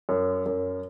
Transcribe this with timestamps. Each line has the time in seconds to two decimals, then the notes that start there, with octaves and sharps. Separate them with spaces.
0.09 F#2
0.46 F#2